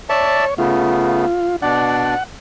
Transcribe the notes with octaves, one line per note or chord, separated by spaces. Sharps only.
C#5 D5 E5 A5
C#3 A3 B3 F4
B2 D4 D5 F#5